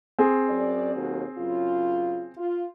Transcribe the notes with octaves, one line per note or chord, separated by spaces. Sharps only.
C4 G#4
F#2 C#4 D5
D#2 B2 F#3
F#2 C#3 F4
F4